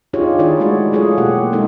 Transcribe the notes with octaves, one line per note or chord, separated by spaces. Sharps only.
D4 D#4 F4 G4 G#4 C#5
D#3 E4 F4 G#4 C#5 D5
E3 G#3 A3 E4 F#4 C#5
F#3 F4 G#4 A4 C#5
B2 A#3 G4 F#5
G#3 B3 D#4 E4 A4